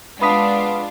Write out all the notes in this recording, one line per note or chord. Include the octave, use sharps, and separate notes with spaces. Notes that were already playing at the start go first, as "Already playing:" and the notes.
G#3 B3 D4 F4 F5 B5 D#6 B6